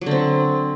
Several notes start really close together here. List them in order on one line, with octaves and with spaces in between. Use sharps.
F#3 D3 C4